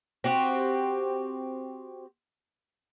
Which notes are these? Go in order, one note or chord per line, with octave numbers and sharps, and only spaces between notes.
C4 F#4 G4